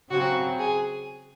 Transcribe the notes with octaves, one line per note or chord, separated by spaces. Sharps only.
C#3 F#3 C4 F#4
G#4